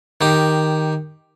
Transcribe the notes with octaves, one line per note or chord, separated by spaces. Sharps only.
D#3 G4